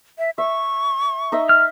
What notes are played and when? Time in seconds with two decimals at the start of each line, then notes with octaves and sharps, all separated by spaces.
0.19 E5
0.38 E5 C#6
1.32 D#4 D#5 E5
1.49 F6